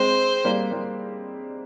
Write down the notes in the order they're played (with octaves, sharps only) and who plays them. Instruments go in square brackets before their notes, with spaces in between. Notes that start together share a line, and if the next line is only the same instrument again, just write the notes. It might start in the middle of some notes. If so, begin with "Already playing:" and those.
Already playing: [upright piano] G#3 C4 [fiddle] C5
[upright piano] G3 A#3
G3 A#3